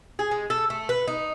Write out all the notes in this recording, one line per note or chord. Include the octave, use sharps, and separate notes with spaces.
G#4
G#3
A4
A3
B4
D#4